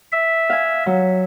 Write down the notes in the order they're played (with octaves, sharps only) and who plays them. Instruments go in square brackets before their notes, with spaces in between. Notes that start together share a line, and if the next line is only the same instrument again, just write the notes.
[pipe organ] E5
[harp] F5 G#5
F#3